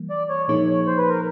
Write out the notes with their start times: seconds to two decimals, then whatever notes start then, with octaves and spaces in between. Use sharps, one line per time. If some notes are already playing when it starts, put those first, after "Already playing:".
Already playing: E3 G3 A#3
0.10 D5
0.29 C#5
0.48 A#2 F3 A#3 D#4 G#4 C#5
0.67 C#5
0.87 C5
0.97 B4
1.09 A#4